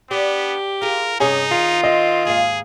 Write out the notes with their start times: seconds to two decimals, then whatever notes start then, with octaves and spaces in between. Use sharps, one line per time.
0.11 B3 D4 G4
0.82 F4 G#4 A#4
1.20 G2 C3 C#4 D#4 G#4
1.51 D#3 F4
1.84 C4 D#5
2.25 D#2 G#2 G#4 F5